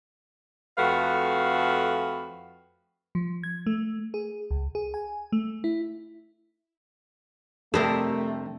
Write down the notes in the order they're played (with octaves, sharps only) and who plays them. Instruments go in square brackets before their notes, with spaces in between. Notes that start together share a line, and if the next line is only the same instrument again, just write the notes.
[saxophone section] F2 A3 F#4 B4 F5
[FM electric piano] F3
G#6
A3
G#4
C#2
G#4
G#5
A3
E4
[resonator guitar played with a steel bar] F2 C3 [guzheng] G3 D4 [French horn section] A3 [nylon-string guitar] A4 A#4